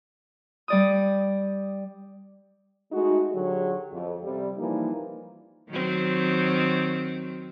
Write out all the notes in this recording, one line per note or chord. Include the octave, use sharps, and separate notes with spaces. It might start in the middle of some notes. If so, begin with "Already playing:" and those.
G3 D5 D#6
G#3 A3 D#4 F#4
D3 F#3 G4 G#4
F2
C3 G3
E3 F3 G3 A#3 D#4
D#3 F#3 C4